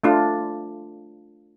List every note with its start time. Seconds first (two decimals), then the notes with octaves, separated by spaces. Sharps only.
0.04 A3 D4 F4